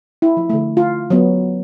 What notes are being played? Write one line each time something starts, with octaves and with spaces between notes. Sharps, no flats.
E4
F3
D3 A3
F4
F#3 B3